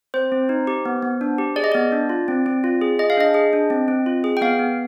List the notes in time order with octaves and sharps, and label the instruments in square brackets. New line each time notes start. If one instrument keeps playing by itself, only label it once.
[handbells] C4 C5
C4
D#4
G4
B3
B3
D4
G4
G#4 D5
D#5
B3 D5
D4
F4
C4
C4
F4
G#4
G#4 D#5
F5
D4 D#5
G#4
D4
C4
C4
F4
G#4
G5
B3 F5
B3